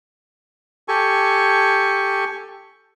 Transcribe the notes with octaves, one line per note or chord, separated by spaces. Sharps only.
G4 A4 G#5 C#6